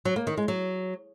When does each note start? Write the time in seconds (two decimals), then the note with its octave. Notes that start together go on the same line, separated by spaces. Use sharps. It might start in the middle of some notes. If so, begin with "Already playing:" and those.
0.05 F#3
0.16 A#3
0.27 D#3
0.37 G#3
0.48 F#3